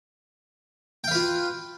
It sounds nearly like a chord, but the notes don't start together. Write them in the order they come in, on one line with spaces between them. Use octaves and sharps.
G5 F5 B4 F4